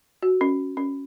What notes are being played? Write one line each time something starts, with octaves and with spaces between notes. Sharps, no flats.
F#4
C#4
C#4